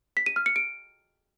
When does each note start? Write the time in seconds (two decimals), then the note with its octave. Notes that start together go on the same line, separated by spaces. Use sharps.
0.17 B6
0.26 D#7
0.36 F6
0.46 C#7
0.56 D7